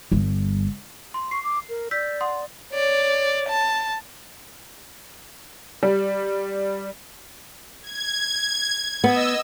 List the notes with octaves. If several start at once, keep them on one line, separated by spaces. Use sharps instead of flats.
G1 G3
C6
C#6 C7
D6
A#4
D5 E6 G6 B6
F#5 C6 D#6
C#5 D5
A5
G3
G#6
B3 D#5 E6